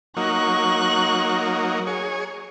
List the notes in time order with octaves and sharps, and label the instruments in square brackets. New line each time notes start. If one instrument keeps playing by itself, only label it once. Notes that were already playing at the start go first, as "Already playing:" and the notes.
[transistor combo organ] F#3 A#3 D#4 [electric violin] C#6 F#6
[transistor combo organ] G#4 C#5